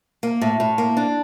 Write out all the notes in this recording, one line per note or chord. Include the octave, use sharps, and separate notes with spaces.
A#3
A2
A2
A#3
D4